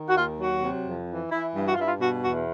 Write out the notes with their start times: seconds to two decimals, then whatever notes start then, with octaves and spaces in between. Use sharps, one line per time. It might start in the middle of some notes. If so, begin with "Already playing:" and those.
Already playing: D#3
0.08 F#4
0.15 D#2 F4
0.39 F#3 F#4
0.62 C3
0.84 F2
1.09 E3
1.31 E3 E4
1.54 G2
1.66 F#4
1.73 F4
1.78 G2 E4
1.87 F4
2.00 B2 F#4
2.23 E2 F#4